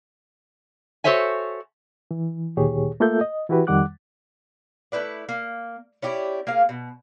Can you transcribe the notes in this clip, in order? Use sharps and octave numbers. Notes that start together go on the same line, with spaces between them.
F#4 A4 C5 C#5 E5 G#5
E3
D2 A#2 D#3 G4 G#4 C#5
A3 A#3 F4 A4 E5 G6
D#5
E3 E4 F#4 G4 B4
F2 D#3 G3 F#5 D6 F#6
A3 E4 B4 D5
A#3
C#4 E4 G4 D5
A#3 G#4 F5
B2